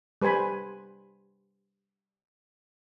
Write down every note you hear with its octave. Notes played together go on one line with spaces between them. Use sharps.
G3 B4 C5 G#5 B5